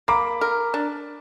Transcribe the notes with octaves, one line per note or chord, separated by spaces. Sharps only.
A#3 B5 D6
A#4
D4